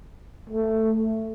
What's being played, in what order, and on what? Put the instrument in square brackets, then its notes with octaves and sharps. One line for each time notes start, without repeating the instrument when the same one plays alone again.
[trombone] A3